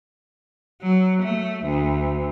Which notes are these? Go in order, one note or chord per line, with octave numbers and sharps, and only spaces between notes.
F#3
A3
D2